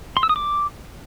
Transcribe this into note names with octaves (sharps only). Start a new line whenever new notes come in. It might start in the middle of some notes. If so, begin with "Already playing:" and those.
C6
E6
D#6
D6